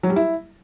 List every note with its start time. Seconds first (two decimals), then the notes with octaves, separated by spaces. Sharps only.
0.03 F#3
0.10 G3
0.16 E4